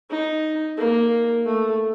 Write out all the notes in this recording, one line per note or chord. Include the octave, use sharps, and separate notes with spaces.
D#4
A#3
A3